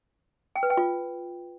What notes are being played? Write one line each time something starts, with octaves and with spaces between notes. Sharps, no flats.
G5
B4
G5
F4